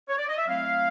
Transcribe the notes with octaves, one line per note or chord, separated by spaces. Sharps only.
C#5
D5
D#5
E5
F#3 A3 C4 E4 F5